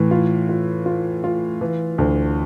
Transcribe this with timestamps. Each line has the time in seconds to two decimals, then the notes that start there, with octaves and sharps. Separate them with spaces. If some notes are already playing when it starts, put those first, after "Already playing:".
Already playing: A2 E3
0.11 F4
0.49 F4
0.86 F4
1.24 F4
1.61 E3
1.98 D2